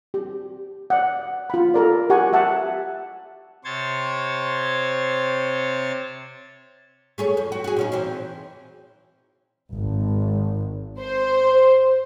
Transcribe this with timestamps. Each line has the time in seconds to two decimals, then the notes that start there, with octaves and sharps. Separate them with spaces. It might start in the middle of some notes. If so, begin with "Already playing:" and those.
0.14 G4
0.90 D5 F#5
1.50 F4 B5
1.74 A4 A#4 D5
2.10 G4 F#5 G#5 C#6
2.33 G4 E5 F#5 A5
3.64 C3 C5 C#5 G#6 A6
7.18 A3 G#4 C#5
7.37 F2
7.52 F#4
7.64 F#4 G#4
7.76 A#2 C#4 D#4
7.92 E3 C4 C5
9.72 G#1
10.99 C5